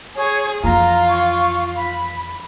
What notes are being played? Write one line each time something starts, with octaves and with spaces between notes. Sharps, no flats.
G#4 C#5
F2 E3 F4 A#5
C#6
B5